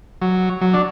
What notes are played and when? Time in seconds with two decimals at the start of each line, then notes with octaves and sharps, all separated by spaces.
0.22 F#3
0.61 F#3
0.74 D4